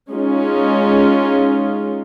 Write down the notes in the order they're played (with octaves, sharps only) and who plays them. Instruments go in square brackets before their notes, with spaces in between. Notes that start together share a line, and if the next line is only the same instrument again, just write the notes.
[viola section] G#3 C#4 D#4 F4